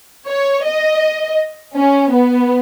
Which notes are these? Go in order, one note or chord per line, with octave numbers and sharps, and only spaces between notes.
C#5
D#5
C#4
B3